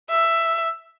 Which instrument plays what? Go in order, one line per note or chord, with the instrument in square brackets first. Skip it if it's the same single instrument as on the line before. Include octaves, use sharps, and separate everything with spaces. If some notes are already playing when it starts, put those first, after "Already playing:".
[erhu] E5